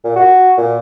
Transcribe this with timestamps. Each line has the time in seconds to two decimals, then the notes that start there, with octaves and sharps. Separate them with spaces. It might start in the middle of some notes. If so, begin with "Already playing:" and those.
0.05 A#2
0.16 F#4
0.57 A#2